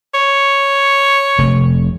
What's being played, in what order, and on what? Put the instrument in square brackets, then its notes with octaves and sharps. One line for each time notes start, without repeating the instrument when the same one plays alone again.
[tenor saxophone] C#5
[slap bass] F1 C3 A3